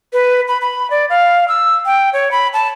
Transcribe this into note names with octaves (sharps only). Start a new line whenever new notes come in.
B4
B5
B5
D5
F5
E6
G5
C#5
B5
A5